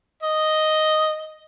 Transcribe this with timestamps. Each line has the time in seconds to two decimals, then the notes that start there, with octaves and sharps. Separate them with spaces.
0.23 D#5